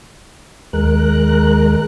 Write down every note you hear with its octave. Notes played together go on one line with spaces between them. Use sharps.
D#2 G#3 A#4 F#6